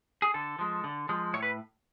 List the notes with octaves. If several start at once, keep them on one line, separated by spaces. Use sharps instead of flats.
G#4
D3 A4
F3 G#3
D3
F3 G#3
A2 C#5
B4